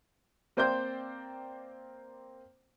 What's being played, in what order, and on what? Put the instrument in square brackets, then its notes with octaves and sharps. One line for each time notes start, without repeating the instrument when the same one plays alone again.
[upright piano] A#3 C4 C5 D5 G5 G6